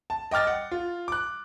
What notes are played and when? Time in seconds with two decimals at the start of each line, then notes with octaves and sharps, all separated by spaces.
0.10 A5
0.31 D#5 G5 D6 F6 A6
0.47 F#5
0.72 F4
1.08 D6 F#6